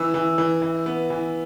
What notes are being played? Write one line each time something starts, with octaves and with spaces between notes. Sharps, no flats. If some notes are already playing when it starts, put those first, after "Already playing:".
Already playing: E3 E6
E3
E3
E3
B3
E3